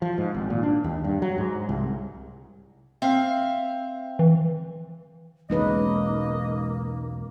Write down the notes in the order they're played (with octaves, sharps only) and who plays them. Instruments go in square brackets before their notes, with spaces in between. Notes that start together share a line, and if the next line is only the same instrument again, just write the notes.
[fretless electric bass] F3
G#2
G#1
A#2
D4
D#2
G2
F#3
G#2
C2
[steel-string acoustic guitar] C4 E5 F5
[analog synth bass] E3
[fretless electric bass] E1 B1 C#3 [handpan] G#3 D#4 B4 [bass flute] A#3 [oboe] D#5